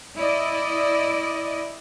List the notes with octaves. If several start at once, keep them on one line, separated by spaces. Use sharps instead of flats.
E4 D5 D#5